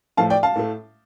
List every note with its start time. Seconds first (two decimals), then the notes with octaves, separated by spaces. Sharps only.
0.17 A2 F3 A3 F5 A5
0.30 D5 G5
0.43 F5 A5
0.56 A2 A3